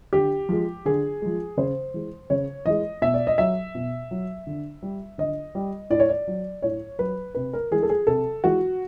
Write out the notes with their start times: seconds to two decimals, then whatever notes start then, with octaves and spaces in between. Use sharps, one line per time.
0.13 D3 G4
0.49 F3 G#3
0.85 D3 G#4
1.22 F3 G#3
1.57 C#3 C5
1.94 E3 G#3
2.30 C#3 C#5
2.66 E3 G#3 D#5
3.02 B2 E5
3.14 D5
3.27 D#5
3.38 F#3 E5
3.75 B2
4.11 F#3
4.47 D3
4.83 G3
5.18 D3 D#5
5.55 G3
5.90 A2 D5
6.00 C#5
6.09 D5
6.28 F#3
6.62 A2 C#5
6.99 F#3 B4
7.35 C3 B4
7.53 A#4
7.71 E3 G#3 G#4
7.83 A4
7.89 G#4
8.07 C3 A4
8.44 E3 G#3 F#4